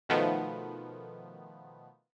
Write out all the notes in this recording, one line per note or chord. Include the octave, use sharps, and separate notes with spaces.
B2 D#3 F3 A3 B3